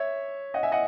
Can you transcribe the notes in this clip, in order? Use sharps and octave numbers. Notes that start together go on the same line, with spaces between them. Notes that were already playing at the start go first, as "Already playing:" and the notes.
Already playing: C#5 E5
D#5 F#5
E5 G#5
D#5 F#5